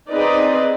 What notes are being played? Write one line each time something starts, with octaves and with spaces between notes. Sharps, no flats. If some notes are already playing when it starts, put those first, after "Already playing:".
C4 D#4 G#4 B4 D5